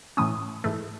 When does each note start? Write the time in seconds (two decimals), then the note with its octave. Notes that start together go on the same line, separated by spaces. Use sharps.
0.17 A2 E3 A3 C#4 D#6
0.64 G#2 E3 A3